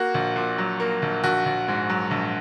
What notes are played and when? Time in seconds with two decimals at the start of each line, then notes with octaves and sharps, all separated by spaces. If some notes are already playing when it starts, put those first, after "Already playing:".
Already playing: A#3 F#4
0.14 A#1
0.36 A#2
0.58 F#3
0.80 A#3
1.02 A#1
1.24 A#1 F#4
1.46 A#1
1.68 G#2
1.90 F#3
2.11 A#1